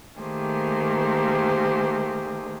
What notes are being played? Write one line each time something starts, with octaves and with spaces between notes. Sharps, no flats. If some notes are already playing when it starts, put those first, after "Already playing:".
D#3 A3 A#3 G4 G#4 C5